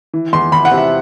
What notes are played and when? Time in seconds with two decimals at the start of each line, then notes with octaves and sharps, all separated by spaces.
0.13 E3
0.33 E2 C6
0.52 E2 B5
0.65 F#5
0.71 C3
0.78 E5